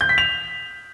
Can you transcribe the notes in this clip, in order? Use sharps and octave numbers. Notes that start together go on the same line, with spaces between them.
G6
B6
F7